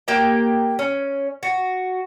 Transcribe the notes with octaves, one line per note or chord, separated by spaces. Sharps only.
A#3 G4 G5
C#4
F#4